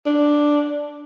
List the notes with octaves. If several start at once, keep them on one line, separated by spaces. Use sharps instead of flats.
D4